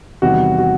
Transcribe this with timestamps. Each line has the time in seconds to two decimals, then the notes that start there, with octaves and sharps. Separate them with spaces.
0.22 E2 C3 D#3 G3 F#4
0.58 F#4